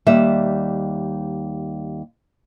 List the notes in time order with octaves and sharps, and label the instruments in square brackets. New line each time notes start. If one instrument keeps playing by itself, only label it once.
[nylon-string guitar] D#2 G3 E5